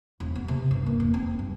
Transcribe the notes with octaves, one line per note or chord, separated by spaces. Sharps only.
E1
B3
C3
G2
A#3
E1
C4
G2